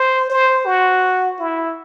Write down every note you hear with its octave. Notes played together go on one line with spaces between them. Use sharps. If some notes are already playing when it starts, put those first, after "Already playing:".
Already playing: C5
C5
F#4
E4